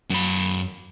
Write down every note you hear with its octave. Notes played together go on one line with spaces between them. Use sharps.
F#2 B5